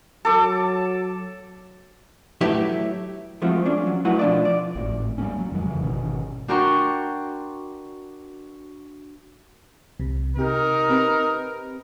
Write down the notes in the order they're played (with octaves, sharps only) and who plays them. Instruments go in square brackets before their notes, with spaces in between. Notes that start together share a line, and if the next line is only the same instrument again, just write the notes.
[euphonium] F#3 [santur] A4 D6
[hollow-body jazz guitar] F#3 A3 E4 G4 B4 E5
F3 G#3 A3 C4 F4 F#4
F3 C#4 D4
F#3
A3 E4 F#4 B4 F#5
B2 F3 D4 F4 D5
D5
[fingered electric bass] G#1 A2
G3 A3 A#3 C#4
F#3
F2 D#3 F#3 G#3
C#3 E3
G#1 B2 D#3 C#4
[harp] D4 F#4 A#4 G5 C6 C#6
[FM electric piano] C2 C3
[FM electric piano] C3 G4 G5 [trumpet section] D#4 A#4
[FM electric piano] C4 G4 B4